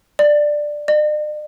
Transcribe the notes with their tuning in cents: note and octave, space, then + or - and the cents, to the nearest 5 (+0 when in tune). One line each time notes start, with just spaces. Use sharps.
D5 +10
D5 +45